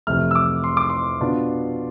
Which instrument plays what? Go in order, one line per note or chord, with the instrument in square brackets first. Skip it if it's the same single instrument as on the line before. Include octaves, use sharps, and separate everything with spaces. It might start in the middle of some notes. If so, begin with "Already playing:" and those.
[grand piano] F2 C3 E3 A3 E4 F6
E6
D6
C6
D6
C6
B2 B3 D4 F4